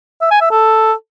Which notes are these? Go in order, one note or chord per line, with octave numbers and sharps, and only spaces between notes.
E5
G#5
E5
A4